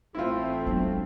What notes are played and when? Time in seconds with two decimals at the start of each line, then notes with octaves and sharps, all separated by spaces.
0.15 A1 A3 C4 E4 F4
0.66 F#3 G#3 B3 D4